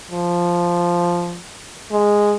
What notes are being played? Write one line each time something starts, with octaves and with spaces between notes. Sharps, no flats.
F3
G#3